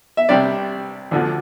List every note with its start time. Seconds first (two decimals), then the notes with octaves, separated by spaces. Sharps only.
0.17 E5
0.29 C2 C3 G3 D4 D5
1.11 D2 D3 F3